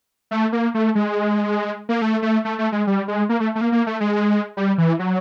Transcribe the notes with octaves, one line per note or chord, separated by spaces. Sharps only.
A3
A#3
A3
G#3
A#3
A3
A3
A3
A3
G#3
G3
G#3
A#3
A3
A3
A#3
A#3
A3
G#3
G3
E3
F#3